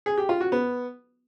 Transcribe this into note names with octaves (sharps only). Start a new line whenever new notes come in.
G#4
G4
F4
F#4
B3